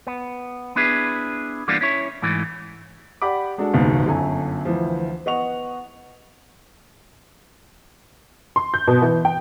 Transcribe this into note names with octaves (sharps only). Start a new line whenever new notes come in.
B3
B3 D4 E4 G#4 B4
E3 G3 A#3 B3 D4 F4
C#4 E4 C#5
G#2 E3 A3
G4 D5 F#5 B5 D6
G#3 D4 F#4 A4 D5
F#1 D#2 G#2 B2 D#3
G1 F#2 A4 G#5
D2 E3 F3
B3 D#5 F#5 C#6 F7
C6
G6
B2
E3
G5